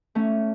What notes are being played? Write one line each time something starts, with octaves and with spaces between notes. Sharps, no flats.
A3 C#4